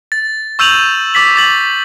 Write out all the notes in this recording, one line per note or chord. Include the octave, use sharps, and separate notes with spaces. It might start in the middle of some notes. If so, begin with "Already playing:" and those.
A6
C#6 E6 G6 D#7 F7 F#7
D6 A6 B6 F#7
D6 A6 F#7